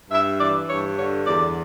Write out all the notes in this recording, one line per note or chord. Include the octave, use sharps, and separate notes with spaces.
G2 E5
E3 D5
G2 C#5
D3 C#5
E2 D5